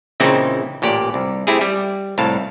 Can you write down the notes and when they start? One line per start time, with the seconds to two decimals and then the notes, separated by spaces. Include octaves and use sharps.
0.20 A#2 C#3 E3 C4 D#4 E4
0.82 A1 A#2 G4 D5
1.14 C2
1.47 A3 C4 E4 G4 G#4
1.61 G3
2.18 C2 A2 F5 A5